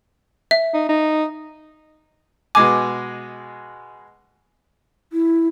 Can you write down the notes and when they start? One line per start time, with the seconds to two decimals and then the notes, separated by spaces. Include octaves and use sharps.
0.51 E5
0.74 D#4
0.89 D#4
2.55 B2 G#3 G#5 D6
5.13 E4